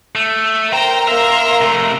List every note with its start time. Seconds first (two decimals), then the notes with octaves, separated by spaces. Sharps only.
0.15 A3
0.72 A#4 C5 G5 A#5
1.08 A#3 E5 C6
1.61 C3 A3